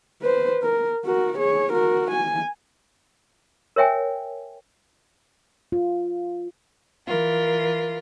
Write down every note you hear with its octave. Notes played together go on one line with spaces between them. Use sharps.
B4 C5
A#4
F#4 A#4
G#4 C#5
F#4 A#4
G#5
A#4 C#5 E5 G5 G#5
F4
E3 F4 A#4